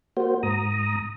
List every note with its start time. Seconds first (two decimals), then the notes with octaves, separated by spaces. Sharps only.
0.17 A#3 F#4 C5
0.43 G#2 A#5 D#6